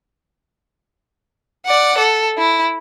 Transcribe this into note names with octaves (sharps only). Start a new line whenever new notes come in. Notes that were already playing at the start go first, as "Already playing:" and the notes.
D5 F#5
A4
E4